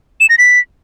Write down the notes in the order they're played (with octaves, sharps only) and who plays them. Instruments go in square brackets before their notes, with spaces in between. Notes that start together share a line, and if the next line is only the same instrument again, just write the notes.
[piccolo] E7
A#6
B6